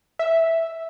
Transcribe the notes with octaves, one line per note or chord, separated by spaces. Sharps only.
E5